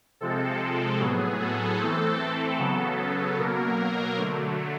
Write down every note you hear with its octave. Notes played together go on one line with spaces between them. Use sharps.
C3 F3 G#3 C4 A4
A4
A2 F#3 B3 G#4
A4
E3 A3 C4
C#3 F#3 B3
B2 F#3 A#3 A#4
D3 F#3 A3